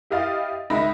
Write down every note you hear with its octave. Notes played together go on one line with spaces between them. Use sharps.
E4 G4 D#5 F5 D#6 A6
C#2 G#3 D#4 E5 B5 A#6